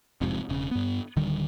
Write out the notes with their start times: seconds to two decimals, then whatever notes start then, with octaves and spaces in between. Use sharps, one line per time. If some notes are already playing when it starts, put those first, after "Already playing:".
0.21 E1 F2 G#2 C3
0.49 E1 C#3
0.71 G2 B3
1.16 D1 D3 D#3 G3